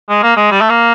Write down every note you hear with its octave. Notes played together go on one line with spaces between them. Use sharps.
G#3
A#3
G#3
G3
A3
A#3